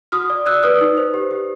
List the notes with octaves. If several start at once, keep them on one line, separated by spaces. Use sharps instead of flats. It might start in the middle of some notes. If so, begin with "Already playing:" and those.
F#4 D#6 F6
D5
D5 E6 F#6
B4 D#6 F6
D#4
C5
G4
G4